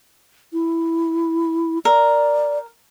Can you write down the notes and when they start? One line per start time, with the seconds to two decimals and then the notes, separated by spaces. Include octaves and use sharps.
0.53 E4
1.85 A#4 D5